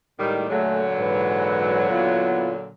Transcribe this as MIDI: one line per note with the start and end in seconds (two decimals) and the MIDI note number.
0.19 0.48 45
0.19 0.47 51
0.19 0.47 55
0.19 0.48 56
0.49 2.71 46
0.49 2.71 50
0.49 2.71 54
0.49 0.83 57
0.49 0.83 68
0.99 1.89 44
0.99 1.89 52
0.99 1.89 71
1.90 2.53 59
1.90 2.53 64
1.90 2.53 65